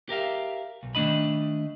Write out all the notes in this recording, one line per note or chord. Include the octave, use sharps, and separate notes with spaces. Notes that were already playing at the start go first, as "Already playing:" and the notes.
G4 A#4 E5 F5
B1
D#3 A3 D4 D#5 B5